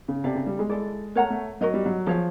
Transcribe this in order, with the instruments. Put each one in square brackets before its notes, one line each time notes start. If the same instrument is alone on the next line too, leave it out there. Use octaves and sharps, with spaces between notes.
[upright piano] C#3
[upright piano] C3 [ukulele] A4 D5 F5
[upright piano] C#3
G3
G#3
[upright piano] G#3 [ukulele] E4 A4 D5
[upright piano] A3 [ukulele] A#4 C#5 F#5 A#5
[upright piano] A3
[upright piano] F#3 [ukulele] F#4 A#4 D#5
[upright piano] G3
F#3
[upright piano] F3 [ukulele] G#4 C#5 F5